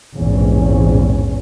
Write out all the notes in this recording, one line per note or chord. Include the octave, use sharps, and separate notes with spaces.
A#1 E2 G#2 C3 C#4